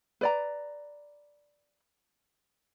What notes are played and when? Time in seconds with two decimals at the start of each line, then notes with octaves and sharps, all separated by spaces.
0.21 B4 D5 A#5